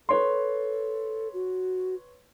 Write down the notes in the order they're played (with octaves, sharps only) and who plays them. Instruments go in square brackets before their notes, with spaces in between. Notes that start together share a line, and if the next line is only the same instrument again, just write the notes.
[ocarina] A4 [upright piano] B4 C#5 C6
[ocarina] F#4